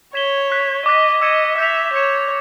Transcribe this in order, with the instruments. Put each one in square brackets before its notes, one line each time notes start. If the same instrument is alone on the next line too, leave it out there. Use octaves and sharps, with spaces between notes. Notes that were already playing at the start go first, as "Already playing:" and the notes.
[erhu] C#5 [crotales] G#6 B6 E7 G7
[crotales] C#6 F#6 B6
[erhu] D#5 [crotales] D6 F#6 B6
[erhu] D#5 [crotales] E6 G#6 C#7 E7
[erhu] E5 [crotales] G6 A#6 C#7 F7
[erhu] C#5 [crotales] G#6 C#7 E7